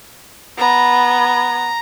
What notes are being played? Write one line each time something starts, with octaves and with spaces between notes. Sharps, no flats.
B3 A#5 B5